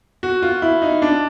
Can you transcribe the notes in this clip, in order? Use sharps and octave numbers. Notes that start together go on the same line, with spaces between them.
F#4
F4
E4
D#4
D4